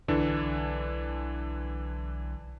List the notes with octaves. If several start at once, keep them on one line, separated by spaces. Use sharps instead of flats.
B1 D3 E3 D4